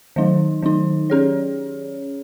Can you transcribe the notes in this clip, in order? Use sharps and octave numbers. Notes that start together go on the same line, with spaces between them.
D#3 F#3 D#4
D#3 F#3 D#4
C#4 G#4 C#5